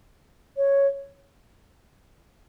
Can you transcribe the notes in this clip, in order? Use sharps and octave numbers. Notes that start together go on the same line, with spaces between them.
C#5